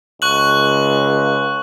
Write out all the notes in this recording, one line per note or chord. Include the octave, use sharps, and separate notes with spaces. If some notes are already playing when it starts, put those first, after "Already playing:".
C#2 C#6 F#6 F#7